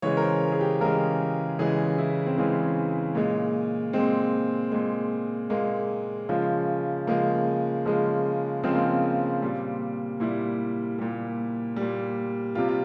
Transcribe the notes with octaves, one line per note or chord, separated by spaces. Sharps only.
C#3 E3 G#3 C#5
A#4
C5
G#4
G4
C#3 E3 G#3 A#4
C#3 E3 G#3 G#4
E4
C4
C#3 E3 G#3 C#4
A#2 G#3
A#2 G#3 C4
A#2 G#3
A#2 G#3 A#3
C#3 F3 G#3
C#3 F3 G#3 A#3
C#3 F3 G#3
C#3 F3 G#3 C4
A#3
C4
A#2 G3
A#2 G3 E4
A#2 G3
G3
A#2
C3 G3 F4
F4